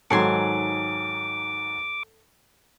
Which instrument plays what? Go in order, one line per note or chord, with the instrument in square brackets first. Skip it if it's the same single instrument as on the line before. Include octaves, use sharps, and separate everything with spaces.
[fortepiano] G#2 D#3 F#3 [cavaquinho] A4 G#5 C6 [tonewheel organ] D6